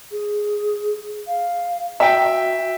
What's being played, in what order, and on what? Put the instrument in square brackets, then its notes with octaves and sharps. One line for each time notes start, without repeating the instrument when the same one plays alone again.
[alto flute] G#4
F5
[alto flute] F#4 [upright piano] E5 G5